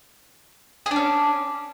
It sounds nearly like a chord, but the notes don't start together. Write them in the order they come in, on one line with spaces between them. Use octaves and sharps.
G#4 D4 C#4